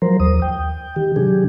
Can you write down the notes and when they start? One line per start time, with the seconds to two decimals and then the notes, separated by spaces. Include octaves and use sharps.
0.02 F3 F#3 A#4 C5
0.20 D#2 D#6
0.42 G5
0.96 D#3 G4
1.16 C3 F#3 D4 G4 G#4